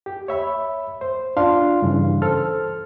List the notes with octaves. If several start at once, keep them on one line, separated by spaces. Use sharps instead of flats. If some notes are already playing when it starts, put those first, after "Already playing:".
G4
C#5 E5 B5
C5
D4 F4 F5 C6
G2 C#3 E3
A4 C5 F6